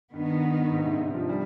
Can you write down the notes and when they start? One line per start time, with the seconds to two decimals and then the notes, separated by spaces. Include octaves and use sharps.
0.13 G2 D#3 B3 D#4
0.72 G#2
0.86 C3
1.00 D3
1.14 F3
1.29 G3